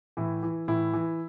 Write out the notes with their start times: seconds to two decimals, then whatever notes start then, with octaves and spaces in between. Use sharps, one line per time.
0.17 A2 E3 E4
0.43 E3
0.68 A2 E3 E4
0.93 E3